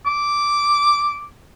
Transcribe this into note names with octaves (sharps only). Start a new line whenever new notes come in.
D6